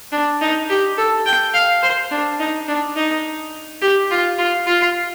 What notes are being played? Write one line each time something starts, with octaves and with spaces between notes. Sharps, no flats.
D4
D#4
G4
A4
G5
F5
C5
D4
D#4
D4
D#4
G4
F4
F4
F4